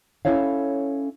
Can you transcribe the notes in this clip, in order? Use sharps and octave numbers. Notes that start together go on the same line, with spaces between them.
C#4 D#4 E4 A4 C#5 F5